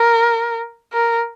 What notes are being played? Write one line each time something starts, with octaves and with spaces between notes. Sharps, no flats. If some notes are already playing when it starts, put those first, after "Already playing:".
Already playing: A#4
A#4